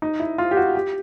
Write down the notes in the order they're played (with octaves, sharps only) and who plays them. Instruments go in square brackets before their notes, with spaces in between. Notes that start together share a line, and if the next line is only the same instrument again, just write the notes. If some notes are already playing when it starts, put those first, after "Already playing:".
[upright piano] D#4
E4
F4
G4
F#4
G4